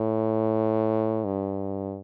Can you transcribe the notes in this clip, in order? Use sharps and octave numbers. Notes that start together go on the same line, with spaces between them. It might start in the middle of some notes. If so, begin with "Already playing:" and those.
Already playing: A2
G2